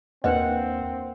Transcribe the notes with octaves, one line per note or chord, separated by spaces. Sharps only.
D#2 A#3 C4 D4 B4 D#5 F#5